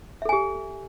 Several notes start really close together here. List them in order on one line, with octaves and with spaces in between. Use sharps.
E5 A4 G#5 G4